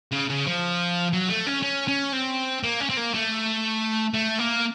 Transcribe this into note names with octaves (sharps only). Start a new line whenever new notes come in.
C#3
C#3
F3
F#3
A3
C#4
C#4
C#4
C4
A#3
C#4
C4
A#3
A3
A3
A#3